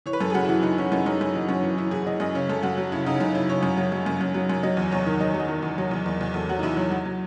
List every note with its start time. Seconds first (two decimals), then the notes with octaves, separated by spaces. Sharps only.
0.06 E3 C#5
0.13 B4
0.21 F#2 A4
0.30 G#4
0.34 F#2 F#4
0.45 E4
0.49 E3 F#4
0.63 E3 D#4
0.77 E3 C#4
0.92 F#2 D#4
1.06 F#2 D#4
1.21 F#2 E4
1.35 E3 D#4
1.49 F#2 C#4
1.63 E3
1.78 E3 E4
1.91 E3 G#4
2.06 E3 D#5
2.20 F#2 D#5
2.35 C#3 C#5
2.50 F#2 A4
2.63 F#2 F#4
2.78 F#3
2.92 C#3 E4
3.06 C#3 D#4
3.20 F#2 D#4
3.34 C#3 E4
3.49 C#3 C#5
3.63 F#2
3.77 F#3
3.92 F#3
4.06 F#2
4.21 F#2
4.34 F#3
4.50 F#2
4.63 F#3 D#5
4.77 E2
4.91 E2 C#5
5.06 D#3
5.20 F#3 D#5
5.34 F#3
5.40 D#5
5.48 D#3
5.63 E2
5.78 F#3
5.91 E2
6.06 E2
6.21 E2
6.34 E2 A4
6.49 F#3 F#4
6.59 D#4
6.63 E2 E4
6.77 F#3
6.91 F#3
7.06 F#3